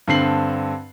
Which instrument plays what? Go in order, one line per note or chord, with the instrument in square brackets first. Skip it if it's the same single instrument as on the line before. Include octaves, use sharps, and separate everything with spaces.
[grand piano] G2 D3 C4 C7 F#7